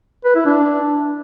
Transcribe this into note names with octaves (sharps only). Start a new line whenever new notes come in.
B4
E4
D4